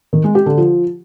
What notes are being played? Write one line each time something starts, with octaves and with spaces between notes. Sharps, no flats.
D#3
G#3
G4
D3
F3